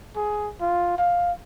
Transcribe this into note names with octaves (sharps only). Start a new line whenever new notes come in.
G#4
F4
F5